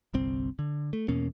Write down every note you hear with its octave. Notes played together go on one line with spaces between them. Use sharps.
G1 C2 C4
D3
A3
E2 B2 A#3 C#4